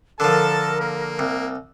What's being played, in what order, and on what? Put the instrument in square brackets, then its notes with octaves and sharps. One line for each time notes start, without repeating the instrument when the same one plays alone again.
[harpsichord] D3 F3 [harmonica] A4 A5 [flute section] A#4
[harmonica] A#3
[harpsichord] C2